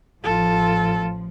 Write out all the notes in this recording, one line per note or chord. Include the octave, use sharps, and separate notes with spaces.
A1 F3 F4 A4